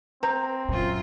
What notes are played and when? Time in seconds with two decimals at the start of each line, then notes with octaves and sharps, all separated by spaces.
0.23 C4 C5 A#5
0.69 F#2 A#2 F4